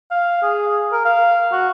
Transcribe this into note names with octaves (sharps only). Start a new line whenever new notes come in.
F5
G#4
A#4
F5
F#4